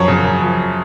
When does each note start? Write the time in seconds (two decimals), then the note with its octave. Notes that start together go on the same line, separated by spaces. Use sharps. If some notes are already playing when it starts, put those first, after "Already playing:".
Already playing: F#2 F3 C#5
0.08 C#3
0.24 F#2
0.41 F3